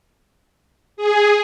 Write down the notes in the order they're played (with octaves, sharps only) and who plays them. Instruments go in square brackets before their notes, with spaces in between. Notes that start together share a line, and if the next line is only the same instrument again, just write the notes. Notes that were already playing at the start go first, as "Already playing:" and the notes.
[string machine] G#4